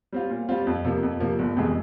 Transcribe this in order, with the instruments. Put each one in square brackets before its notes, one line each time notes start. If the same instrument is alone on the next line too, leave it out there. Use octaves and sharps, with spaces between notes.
[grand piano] G3 C4 F4
A#2
G3 C4 F4
F2
C3 F3 A#3
F2
C3 F3 A#3
G1
F2 C3 E3 G#3